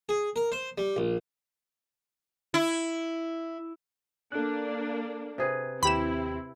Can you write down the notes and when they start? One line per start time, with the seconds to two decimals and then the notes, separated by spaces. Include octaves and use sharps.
0.09 G#4
0.36 A#4
0.52 C5
0.78 G3
0.97 A#1
2.54 E4
4.32 A#3 D4 A4 F#6
5.38 C3 G#4 B4
5.83 D#2 C4 E4 G4 B5 E7